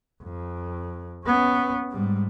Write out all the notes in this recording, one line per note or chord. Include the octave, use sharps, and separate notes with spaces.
F2
B3 C#4
G#2 G3